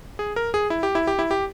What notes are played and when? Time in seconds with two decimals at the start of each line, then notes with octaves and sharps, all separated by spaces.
0.19 G#4
0.36 A#4
0.54 G#4
0.70 E4
0.83 G4
0.95 E4
1.07 G4
1.19 E4
1.31 G4